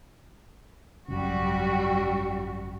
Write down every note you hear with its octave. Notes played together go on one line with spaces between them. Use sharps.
G#1 F#2 C#3 G3 F#4